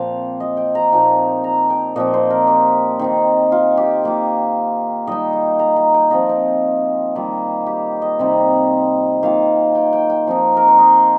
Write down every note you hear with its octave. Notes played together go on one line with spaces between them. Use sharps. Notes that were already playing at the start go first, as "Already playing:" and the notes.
Already playing: A#2 F3 C4 F4 F5
D#5
G5
A#5
A#2 F3 C4 D#4 G5
A#5
G5
A#2 F3 C4 D#5
C5
A#4
G4
D#3 C4 D#4
F4
G4
D#3 A#3 F4
D#3 G3 D#4 D#5
G5
A#5
A#5
G5
F3 C4 F4 D#5
D#5
D#3 G3 A#3 F4
G4
D#5
C3 G3 C4 D#4
D#3 A#3 F4 F5
G5
G5
G5
F3 C4 D#4
A#4
C5
D#5